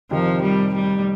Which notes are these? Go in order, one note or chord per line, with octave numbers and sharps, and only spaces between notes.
F2 C3 D#3 F3
G3
G3